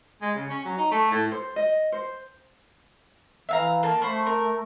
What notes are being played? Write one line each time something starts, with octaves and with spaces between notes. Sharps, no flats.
G#3
C#3
C#4
F#3
D#4
A3
A2
C5
D#5
C5
E3 E5 F5 A#5
A#3 A5
A3 C5 B5 C#6
A#4